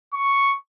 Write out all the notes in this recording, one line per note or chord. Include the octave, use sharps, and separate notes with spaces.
C#6